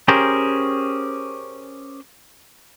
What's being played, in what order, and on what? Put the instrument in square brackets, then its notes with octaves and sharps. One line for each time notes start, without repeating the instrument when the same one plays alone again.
[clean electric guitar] C#4 G4 G#4 A#4 C5